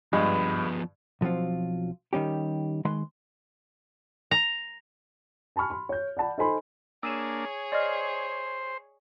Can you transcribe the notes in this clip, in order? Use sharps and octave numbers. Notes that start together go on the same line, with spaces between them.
G2 F3 G#3 B3 B5
B1 F3 F#3 C4 F4
D#3 G3 C#4 G4
D#3 G#3 B4 C6
A#5
G#5 A5 B5 C#6 F6
B5 C6
C#5 G6
D5 F#5 A5 B5
D#4 A4 C5 G#5 B5 C6
A#3 D4 G#4 C#5 E6 D#7 E7
C5 D5 D#5 F6